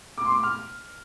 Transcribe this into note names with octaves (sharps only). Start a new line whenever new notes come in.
D6
C6
D6
F6